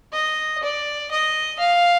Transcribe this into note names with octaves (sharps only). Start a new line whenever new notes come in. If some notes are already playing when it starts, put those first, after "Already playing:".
D#5
D5
D#5
F5